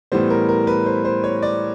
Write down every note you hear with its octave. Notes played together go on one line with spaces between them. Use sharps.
A2 E3 G3 B3 C5
A#4
A#4
B4
C5
C5
C#5
D5